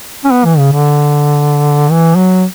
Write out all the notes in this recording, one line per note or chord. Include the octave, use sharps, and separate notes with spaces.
C#4
B3
E3
C#3
D3
E3
F#3